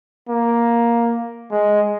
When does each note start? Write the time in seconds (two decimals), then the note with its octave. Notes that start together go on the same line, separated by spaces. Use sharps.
0.29 A#3
1.51 G#3